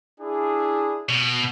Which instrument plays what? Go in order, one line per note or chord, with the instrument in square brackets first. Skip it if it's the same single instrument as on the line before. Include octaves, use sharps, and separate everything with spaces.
[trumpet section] D4 E4 G#4
[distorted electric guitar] B2